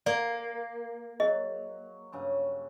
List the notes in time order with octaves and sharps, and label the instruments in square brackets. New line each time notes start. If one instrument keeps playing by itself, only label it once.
[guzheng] A#3 [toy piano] D5
[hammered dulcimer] F#3 [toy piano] G#4 D#5
[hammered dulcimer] G2 C#3 F#3